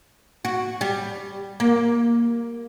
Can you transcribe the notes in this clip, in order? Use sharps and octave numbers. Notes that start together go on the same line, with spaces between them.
F#4
G3
A#3